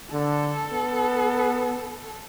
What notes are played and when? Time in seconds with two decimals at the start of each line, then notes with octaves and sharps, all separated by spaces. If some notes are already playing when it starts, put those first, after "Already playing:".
0.12 D3 A4
0.72 B3